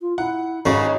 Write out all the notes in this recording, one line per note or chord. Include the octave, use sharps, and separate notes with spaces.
F4
E4 F#5
G#1 C#3 F#3 D#4 F#4